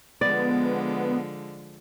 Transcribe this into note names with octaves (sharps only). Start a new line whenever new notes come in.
D3 F3 G#3 B3 D5